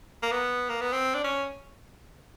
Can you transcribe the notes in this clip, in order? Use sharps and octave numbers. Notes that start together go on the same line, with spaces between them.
A#3
B3
A#3
B3
C4
D4
C#4